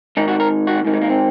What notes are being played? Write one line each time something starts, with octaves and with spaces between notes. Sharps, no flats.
G#2 D#3 D#4
F#4
A#4
F#4
G#2 D#3
G#3
A#3
C4